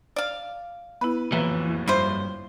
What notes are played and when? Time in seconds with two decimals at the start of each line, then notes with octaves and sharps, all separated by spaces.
0.16 D5 F5
1.01 B3 E4 B4
1.32 F#1 F2 A2 E3 A#3 B4 E5
1.88 G2 E4 F4 C5